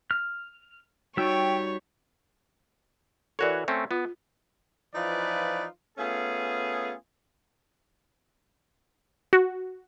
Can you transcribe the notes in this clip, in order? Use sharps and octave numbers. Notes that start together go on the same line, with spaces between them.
F6
G3 D#4 F#4 C#5 G5 E6 G6
E3 F#4 A4 A#4 C#5 D5
A3 C4 C#4
B3 F4
E3 F3 D#4 F4 B4 D5
A3 B3 C#4 F4 G#4
F#4